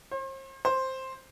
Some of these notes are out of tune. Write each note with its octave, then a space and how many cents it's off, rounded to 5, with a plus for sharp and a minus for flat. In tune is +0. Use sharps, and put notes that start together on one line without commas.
C5 +40
C5 +5